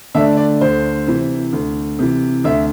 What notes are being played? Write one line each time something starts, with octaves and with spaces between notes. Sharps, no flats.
D3 A3 D4 E5
D5
D2 C5
C3 E3
D2
C3 E3
D2 E5